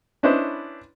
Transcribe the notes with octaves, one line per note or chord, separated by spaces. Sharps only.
C#4 D4 E4 B4 C5 D#5